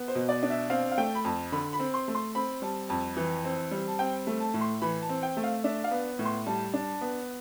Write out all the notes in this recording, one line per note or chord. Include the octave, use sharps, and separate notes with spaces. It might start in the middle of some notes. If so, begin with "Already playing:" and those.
Already playing: B3
C5
B2
D5
D4
E5
C4 F5
F5
A3 G5
B5
F2 A5
D3 B5
B5
C4
C6
A3
C6
C4 B5
G3 A5
F2 A5
E3
C4
G3
A5
C4 G5
A3
A5
A2
C6
E3 B5
A5
C4
G5
A3
F5
D4 E5
F5
B3
A2
C6
G3 A5
D4
B3